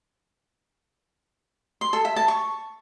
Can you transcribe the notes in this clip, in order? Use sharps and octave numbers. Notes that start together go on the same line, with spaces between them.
C6
A4
E5
A5
C#6